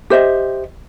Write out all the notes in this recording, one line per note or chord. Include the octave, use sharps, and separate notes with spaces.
G4 C5 D#5 E5